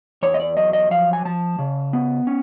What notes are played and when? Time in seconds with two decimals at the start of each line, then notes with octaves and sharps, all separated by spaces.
0.23 E2 C#5
0.34 D#5
0.40 D5
0.57 F#3 D#5
0.73 D#5
0.91 F3 F5
1.13 G#5
1.25 F3 A5
1.59 C#3
1.93 B3
2.27 C#4